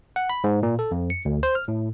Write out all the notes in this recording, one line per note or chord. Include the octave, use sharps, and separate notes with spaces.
F#5
B5
G#2
A#2
A4
F2
C#7
D2
C5
F6
A2